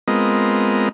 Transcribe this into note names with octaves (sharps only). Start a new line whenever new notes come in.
G#3 B3 C4 F4 A#4 D#5